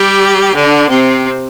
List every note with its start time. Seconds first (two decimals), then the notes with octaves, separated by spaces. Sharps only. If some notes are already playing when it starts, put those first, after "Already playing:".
Already playing: G3 G4
0.54 D3 D4
0.90 C3 C4